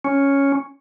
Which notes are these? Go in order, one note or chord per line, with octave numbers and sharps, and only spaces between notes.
C#4